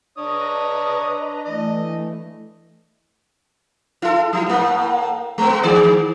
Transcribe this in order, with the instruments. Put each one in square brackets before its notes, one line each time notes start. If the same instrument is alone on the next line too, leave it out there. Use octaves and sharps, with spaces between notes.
[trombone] D4 [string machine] B4 D#5 A#5 [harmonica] C#5 D#6
[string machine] E3 A3 [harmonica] D#5
[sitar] E4 A4
F#3 E4
A2 A#3
G#3 B3
D#3 G#4 D5